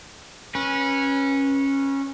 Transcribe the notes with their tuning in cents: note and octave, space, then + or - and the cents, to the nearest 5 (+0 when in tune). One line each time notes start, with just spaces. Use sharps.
C#4 -15 B4 -30